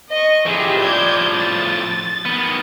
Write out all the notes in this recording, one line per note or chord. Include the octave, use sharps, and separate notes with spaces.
D#5 C#6
A2 F3 G4 G#4 E5
D5 G6 G#6
A6
D#3 B3